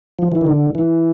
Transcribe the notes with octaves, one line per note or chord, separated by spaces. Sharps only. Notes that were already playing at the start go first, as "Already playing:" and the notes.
F3
E3
D#3
D3
E3